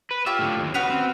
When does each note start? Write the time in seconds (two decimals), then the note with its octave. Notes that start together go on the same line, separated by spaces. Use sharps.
0.11 B4
0.26 F4 G4 C#5 E5
0.39 A2 D3
0.59 D#2
0.74 C#3 F#4 B4 F6
0.90 C4